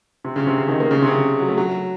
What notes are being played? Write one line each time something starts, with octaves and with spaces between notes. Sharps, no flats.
C3
C#3
C3
C#3
D#3
A#3
C#3
C3
C#3
F#3
A3
F#3